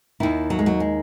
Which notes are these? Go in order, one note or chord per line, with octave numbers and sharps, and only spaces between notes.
D#2 D#3 E4
F#3
G#3
F#3
G#3